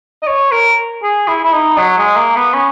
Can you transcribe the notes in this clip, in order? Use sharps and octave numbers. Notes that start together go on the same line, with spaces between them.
D#5
C#5
A#4
G#4
E4
E4
D#4
F#3
G#3
A#3
B3
C#4